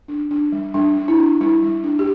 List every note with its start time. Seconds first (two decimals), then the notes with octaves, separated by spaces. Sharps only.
0.08 D4
0.31 D4
0.52 G3
0.74 G3 D4
0.97 D4
1.08 E4
1.18 D4
1.40 G3 E4
1.63 G3
1.84 D4
1.99 G4